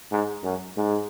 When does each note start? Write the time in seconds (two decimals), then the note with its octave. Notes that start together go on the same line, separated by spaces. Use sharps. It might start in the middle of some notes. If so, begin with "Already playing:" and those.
0.11 G#2
0.44 F#2
0.77 G#2